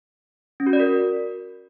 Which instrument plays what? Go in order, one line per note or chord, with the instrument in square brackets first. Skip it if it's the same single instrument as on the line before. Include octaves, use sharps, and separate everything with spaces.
[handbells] C#4
F#4
D5
A#4